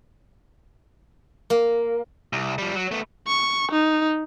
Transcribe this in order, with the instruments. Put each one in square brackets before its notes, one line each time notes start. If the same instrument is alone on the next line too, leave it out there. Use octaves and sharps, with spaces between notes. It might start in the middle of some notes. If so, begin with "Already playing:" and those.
[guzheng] A#3
[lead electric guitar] C2
F3 G3
F#3
A3 B3
[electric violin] C#6
D#4